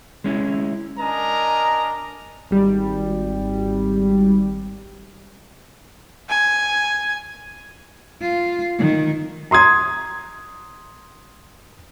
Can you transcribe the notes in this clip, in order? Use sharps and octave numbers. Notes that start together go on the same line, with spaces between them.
G#3 C#4 E4
D4 A#4 D#5 G#5 A#5
G#1 G3
G#5
F4
D#3
A#5 C6 D#6 G#6